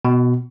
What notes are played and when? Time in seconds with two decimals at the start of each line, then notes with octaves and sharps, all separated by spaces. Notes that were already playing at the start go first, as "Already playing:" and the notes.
0.05 B2